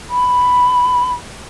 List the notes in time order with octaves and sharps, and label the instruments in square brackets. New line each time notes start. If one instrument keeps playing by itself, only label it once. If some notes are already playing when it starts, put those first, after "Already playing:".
[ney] B5